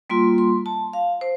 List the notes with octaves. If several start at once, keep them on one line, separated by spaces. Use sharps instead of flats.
G3 A#3 F4 C6
C6
A5
F5
C5